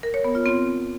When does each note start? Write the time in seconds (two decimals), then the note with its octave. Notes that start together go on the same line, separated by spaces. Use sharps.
0.03 A#4
0.14 C#5
0.24 B3
0.35 F4
0.46 C4